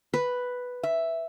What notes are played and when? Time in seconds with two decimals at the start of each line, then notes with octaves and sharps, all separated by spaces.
0.14 B4
0.83 E5